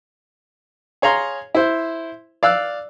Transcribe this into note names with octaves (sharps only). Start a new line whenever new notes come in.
G#4 C#5 F5 A#5 C6
E4 C5
D5 F5 E6 F#6